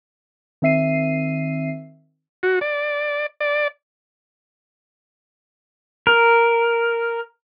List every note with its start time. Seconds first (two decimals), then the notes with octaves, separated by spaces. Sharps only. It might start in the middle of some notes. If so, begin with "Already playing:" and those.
0.62 D#3 C4 E5 C7 D#7
2.43 F#4
2.61 D5
3.41 D5
6.07 A#4